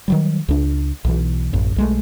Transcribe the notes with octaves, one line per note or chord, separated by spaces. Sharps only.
D#3 F#3 G3
C#2 D4
B1 B2 E3
A1 F#2
B1 G#3 A3